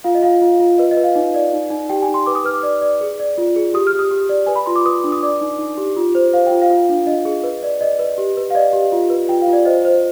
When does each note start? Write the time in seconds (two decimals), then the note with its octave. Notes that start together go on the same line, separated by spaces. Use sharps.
0.04 F4 F5
0.15 D#5
0.23 F4 F5
0.42 F4
0.60 F4
0.78 B4 D#5
0.91 D#5
0.97 B4
1.03 F5
1.15 D#4
1.34 D5
1.53 D#4
1.71 D#4
1.89 G4 G5
2.02 G#5
2.08 D#4
2.14 C6
2.26 B4 D6
2.35 D#6
2.45 B4 F6
2.54 D6
2.63 D5
2.81 D5
3.01 G#4
3.20 D5
3.38 F4
3.56 G#4
3.74 G4 D#6
3.87 F6
3.93 G4
3.99 D#6
4.11 G4
4.29 D5
4.47 B4 G#5
4.56 B5
4.66 F4 C6
4.76 D6
4.86 B4 D#6
5.04 D4
5.12 D#6
5.23 D5 D6
5.41 D#4
5.59 D#4
5.77 G4
5.96 F4
6.15 C5
6.33 C5 F5
6.47 F4 G5
6.62 F5
6.70 F4
6.89 D4
7.06 D4 D#5
7.25 G#4
7.44 B4
7.63 D5
7.81 D5 D#5
7.99 B4
8.18 G4
8.37 B4
8.50 F5
8.55 D5 D#5
8.73 G4
8.92 F4
9.10 B4
9.29 F4 G5
9.42 F5
9.47 F4
9.53 D5
9.65 C5 D#5
9.85 C5